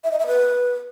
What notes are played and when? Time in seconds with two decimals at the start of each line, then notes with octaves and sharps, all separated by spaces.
0.04 E5
0.12 D#5
0.19 E5
0.27 B4